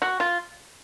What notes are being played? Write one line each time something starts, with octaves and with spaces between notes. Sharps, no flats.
F#4
F4